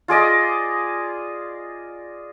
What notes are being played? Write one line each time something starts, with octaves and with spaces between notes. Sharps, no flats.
F4 G#4 D5 D#5